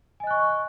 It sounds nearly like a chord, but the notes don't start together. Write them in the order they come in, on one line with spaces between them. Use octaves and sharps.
G#5 D#5 F#6 C#6